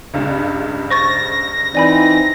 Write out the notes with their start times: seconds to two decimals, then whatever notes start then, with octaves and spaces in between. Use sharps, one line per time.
0.14 C#2 G2 C#3
0.90 C5 C#6 A6 A#6
1.75 E3 C4 D#4 D5 G#5 B5